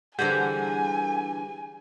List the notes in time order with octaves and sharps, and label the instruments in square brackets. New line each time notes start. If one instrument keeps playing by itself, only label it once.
[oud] D3 E3 G3 [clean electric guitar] G#4 C5 F#5 [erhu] G#5 [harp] G6